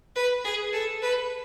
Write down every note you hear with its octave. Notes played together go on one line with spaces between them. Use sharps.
B4
G#4
A4
B4